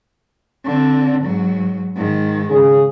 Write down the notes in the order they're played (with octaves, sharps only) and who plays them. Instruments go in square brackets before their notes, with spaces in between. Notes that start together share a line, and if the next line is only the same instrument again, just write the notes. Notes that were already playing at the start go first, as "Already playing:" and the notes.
[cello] D3 C4
G#2 F#3
G#2 D#3
[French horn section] C#3 C#4 G#4